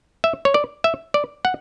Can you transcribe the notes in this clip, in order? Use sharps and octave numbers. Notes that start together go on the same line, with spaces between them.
E5
C#5
D5
E5
D5
F#5